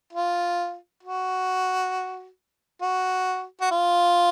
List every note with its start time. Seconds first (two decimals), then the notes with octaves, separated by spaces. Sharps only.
0.13 F4
1.03 F#4
2.82 F#4
3.61 F#4
3.71 F4